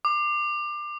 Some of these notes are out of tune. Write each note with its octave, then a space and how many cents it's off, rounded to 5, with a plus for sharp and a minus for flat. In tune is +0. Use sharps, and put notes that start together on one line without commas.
D6 +25